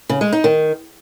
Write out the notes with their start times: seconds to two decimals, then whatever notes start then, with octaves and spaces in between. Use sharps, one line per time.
0.09 C#3
0.21 G#3
0.32 D#4
0.44 D#3